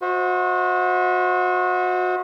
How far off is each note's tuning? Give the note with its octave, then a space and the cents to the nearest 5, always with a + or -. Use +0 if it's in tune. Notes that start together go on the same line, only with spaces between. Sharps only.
F#4 -30 C5 +0 D#5 +40